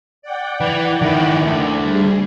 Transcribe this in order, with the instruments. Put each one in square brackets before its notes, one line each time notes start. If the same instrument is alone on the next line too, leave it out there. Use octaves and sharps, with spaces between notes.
[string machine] D5 F#5 G5
[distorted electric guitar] E3
D#3 E4
D2 D3
[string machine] G3 G#4